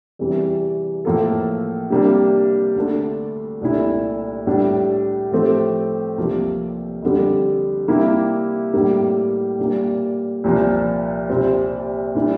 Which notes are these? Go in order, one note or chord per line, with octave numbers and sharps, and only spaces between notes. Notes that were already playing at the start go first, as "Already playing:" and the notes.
E2 C3 E3 G3
A2 F3 A#3 F4 A4
C3 G3 A#3 D4
D2 D3 A3 D4
C2 A#2 A3 E4
A2 G3 D4
A2 F3 A3 C4 G4
C2 C3 F3 A#3
F2 D3 G3
C3 G3 A#3 E4 G4
A2 G3 A#3
A#2 G3 A#3
C2 A#2 F3 A#3
C2 A#2 G3 C4
A#2 G3 C4 E4